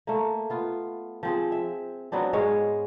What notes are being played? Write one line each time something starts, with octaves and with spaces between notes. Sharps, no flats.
A3 A#3
B3 F4
F3 C4 G#4
E5
F#3 B3 C4 D4
G#2 G#3 C#5 F5